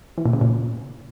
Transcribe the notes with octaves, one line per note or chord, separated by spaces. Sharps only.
E3
A#2
C#3
A#2